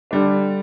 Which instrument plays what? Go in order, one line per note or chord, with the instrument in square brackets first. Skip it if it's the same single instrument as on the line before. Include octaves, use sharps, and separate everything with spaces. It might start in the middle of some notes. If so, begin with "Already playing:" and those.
[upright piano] D3 G3 D4